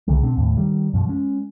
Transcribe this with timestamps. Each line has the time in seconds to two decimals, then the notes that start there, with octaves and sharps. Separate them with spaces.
0.08 C2 D3 D#3 G#3
0.23 B2 C4 D4
0.37 D#2 A2
0.57 D#3 G3
0.93 F#2 B2 F3
1.08 G#3 C#4